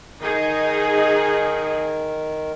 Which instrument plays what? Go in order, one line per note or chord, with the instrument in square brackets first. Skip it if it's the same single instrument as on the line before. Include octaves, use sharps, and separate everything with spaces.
[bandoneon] D#3 [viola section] D#4 G#4